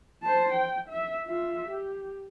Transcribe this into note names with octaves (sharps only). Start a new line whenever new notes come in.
C5 A5
G5
E5
F4 E5
G4